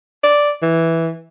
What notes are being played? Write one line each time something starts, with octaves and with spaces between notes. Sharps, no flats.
D5
E3